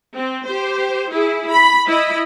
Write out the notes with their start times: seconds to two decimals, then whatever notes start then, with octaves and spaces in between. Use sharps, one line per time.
0.15 C4
0.46 G4 C5
1.12 E4 G#4
1.49 B5
1.87 E4 D#5 B5